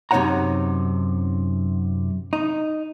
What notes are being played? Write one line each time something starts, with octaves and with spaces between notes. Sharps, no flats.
F#2 C3 D#4 C#5 F#5 A#5
D#4